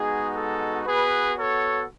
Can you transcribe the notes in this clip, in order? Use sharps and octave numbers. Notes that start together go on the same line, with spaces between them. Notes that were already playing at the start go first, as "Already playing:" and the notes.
Already playing: G#3 B3 D#4 F#4 G#4
A4
B3 F#4 G#4 B4
A4 C#5